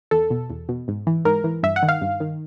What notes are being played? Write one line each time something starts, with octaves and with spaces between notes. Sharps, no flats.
E2 A4
B2
E2
B2
G#2
E3
G#2 A#4
E3
G2 E5
F#5
D#3
F5
G2
D#3